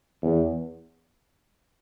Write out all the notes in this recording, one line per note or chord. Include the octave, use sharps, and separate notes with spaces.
E2